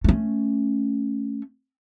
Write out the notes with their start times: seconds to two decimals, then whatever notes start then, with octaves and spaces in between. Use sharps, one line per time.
0.04 A3 C#4